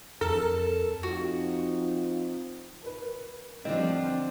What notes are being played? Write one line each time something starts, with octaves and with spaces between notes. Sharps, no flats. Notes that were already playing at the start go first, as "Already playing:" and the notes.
F2 A4 A#4
F3 C4 D#4 F4 F#4
A#4 B4
D3 E3 F3 G3 C4 D4 D#5